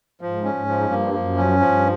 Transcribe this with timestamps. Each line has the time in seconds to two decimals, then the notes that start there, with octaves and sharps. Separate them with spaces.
0.21 G#2 F3
0.44 C#4
0.53 G#2
0.67 F3
0.82 G2
0.90 A#3
1.14 F#2 F3
1.37 C#4
1.60 G2 F3